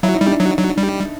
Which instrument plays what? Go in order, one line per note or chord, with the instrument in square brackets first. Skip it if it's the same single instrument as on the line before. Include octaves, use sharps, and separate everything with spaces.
[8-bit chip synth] F#3 [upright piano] E4
[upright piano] D#4
[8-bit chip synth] G3
[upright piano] D4
[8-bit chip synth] F#3 [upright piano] D#4
[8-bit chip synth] F#3
G3